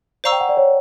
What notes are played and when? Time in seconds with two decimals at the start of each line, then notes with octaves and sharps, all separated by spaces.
0.24 C5 D5 F5 A#5 C#6 E6
0.32 G5
0.41 F#5
0.49 D5
0.57 C#5